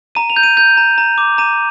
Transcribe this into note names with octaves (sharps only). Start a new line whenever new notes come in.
A#5 D#7
F7
G6
D#7
G6
A#5
A#5
D6
A#5 D#7